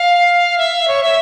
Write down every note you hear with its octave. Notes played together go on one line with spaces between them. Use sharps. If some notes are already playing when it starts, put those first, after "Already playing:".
Already playing: F5
E5
C#5
E5